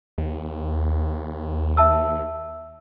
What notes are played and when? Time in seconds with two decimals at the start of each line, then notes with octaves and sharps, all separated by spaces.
0.18 D#2
1.77 E5 A5 E6